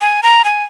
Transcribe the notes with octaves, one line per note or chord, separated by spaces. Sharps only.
G#5
A#5
G#5